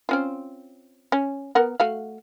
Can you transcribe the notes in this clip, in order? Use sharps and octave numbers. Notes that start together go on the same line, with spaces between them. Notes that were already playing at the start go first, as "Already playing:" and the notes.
C4 C#4 F4
C#4
B3 A#4 F#5
A3 F#4 F5